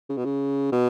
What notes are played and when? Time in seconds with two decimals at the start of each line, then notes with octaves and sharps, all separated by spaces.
0.09 C#3
0.17 B2
0.25 C#3
0.72 B2